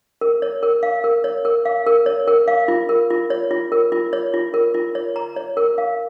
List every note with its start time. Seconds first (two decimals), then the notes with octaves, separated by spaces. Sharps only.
0.21 A#4
0.42 C#5
0.63 A#4
0.83 F5
1.04 A#4
1.24 C#5
1.45 A#4
1.65 F5
1.87 A#4
2.06 C#5
2.27 A#4
2.48 F5
2.68 F4
2.89 A#4
3.10 F4
3.30 C#5
3.51 F4
3.72 A#4
3.92 F4
4.13 C#5
4.34 F4
4.54 A#4
4.74 F4
4.95 C#5
5.16 A#5
5.36 C#5
5.57 A#4
5.78 F5